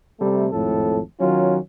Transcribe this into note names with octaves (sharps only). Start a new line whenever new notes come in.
C3 G3 A3
G#1 F2 A2 A4
D#3 F#3 C#4 F4